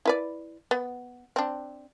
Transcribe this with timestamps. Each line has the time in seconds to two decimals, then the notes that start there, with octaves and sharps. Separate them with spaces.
0.05 E4 B4 D5
0.71 B3
1.36 C4 D4